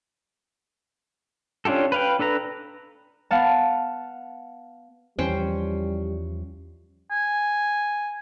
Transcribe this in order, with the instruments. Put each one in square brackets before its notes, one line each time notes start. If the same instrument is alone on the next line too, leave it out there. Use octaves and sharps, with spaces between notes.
[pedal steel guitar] C#4 D4 F4 G4 A4
B4 F5 G5
D4 A4 B4 A#5
[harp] B3 F5 F#5 A5
[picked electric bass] E2 E3 F3 [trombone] G3 [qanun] C#4 C5 G5
[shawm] G#5